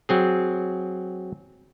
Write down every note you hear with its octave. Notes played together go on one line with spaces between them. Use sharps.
F#3 C4 G#4